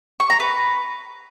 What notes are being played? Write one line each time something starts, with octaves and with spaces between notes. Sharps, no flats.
C#6
A#5
B4